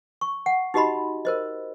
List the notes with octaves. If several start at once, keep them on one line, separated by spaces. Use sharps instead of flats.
C#6
F#5
D#4 F#4 G4 D#5 B5 C6
A#4 C5 D#5